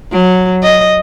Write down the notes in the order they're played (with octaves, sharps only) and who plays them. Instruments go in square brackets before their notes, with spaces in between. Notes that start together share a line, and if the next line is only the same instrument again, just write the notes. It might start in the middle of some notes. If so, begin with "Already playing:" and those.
[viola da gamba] F#3
D#5